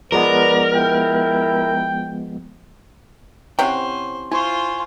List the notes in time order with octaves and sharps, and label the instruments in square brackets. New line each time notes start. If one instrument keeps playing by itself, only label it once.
[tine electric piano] F3 G#3 B3 [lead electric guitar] A#4 [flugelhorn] B4 [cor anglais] D5
[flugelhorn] E4 [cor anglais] G5
[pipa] C3 C#4 [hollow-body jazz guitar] E4 F#5 G5 [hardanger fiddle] C5
[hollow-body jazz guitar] E4 [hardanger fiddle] F4 C5 [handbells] G#5 C6 C#6